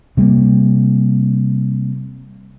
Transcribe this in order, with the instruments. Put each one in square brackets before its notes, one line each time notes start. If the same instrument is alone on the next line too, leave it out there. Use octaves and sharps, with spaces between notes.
[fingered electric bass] C3 G3 G#3 A#3